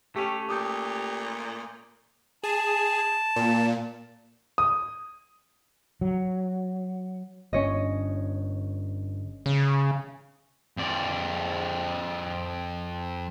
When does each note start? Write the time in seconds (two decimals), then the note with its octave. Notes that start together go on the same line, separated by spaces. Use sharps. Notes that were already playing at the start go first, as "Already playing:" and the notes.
0.16 A3 C#4 G4
0.49 A#2 G4 D6 D#6 G6
2.43 G#4 A5
3.36 A#2
4.58 D#6
6.01 F#3
7.53 G1 C#4 C#5 D#5
9.46 C#3
10.77 F2 D5